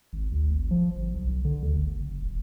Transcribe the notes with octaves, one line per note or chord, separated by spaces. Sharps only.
G#1
D2
G#1
F3
G1
B1
B1
D3
D2
G1
F#1
D1